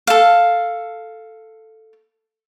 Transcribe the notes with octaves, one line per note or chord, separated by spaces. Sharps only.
A4 F5